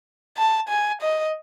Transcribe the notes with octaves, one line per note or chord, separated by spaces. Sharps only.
A5
G#5
D#5